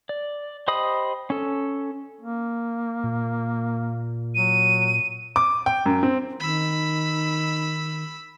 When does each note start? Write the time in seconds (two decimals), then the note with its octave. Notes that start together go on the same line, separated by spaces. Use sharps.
0.09 D5
0.68 G4 C5 D#5 B5 D#6
1.30 C#4 A4
2.21 A#3
3.04 A#2
4.35 F#3 D#7
5.36 D6
5.66 G5
5.86 F#2
6.03 C4
6.40 D#3 B5 E6